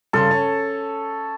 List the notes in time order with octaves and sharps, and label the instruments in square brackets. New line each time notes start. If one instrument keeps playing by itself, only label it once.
[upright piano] G2 C#3 C6 [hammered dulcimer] A4
[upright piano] C#4